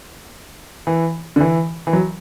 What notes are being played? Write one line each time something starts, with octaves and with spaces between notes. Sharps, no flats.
E3
D3
E3
E3
F#3